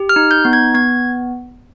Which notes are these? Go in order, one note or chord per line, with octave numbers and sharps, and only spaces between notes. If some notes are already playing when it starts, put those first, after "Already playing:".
Already playing: G4
F6
D#4
G6
B3
G#6
B3 G#6